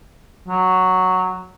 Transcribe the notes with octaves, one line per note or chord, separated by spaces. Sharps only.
F#3